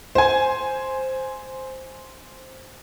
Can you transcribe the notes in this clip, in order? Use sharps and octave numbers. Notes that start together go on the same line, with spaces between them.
C5 G#5